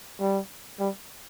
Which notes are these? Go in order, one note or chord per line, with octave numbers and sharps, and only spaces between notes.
G3
G3